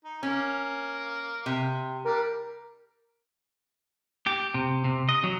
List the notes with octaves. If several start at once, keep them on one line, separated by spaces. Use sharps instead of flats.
D#4
A#3 C#4
C3
G3 D4 A#4
G4
C3
C3
D#5
F#3